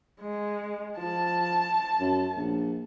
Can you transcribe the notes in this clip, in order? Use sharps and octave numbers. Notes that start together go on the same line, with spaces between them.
G#3
F3 A5
F#2
A#1